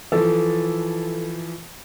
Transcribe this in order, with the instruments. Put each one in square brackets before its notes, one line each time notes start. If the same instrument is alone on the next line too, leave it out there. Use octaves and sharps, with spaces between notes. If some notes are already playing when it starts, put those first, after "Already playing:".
[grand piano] E3 F3 [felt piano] A4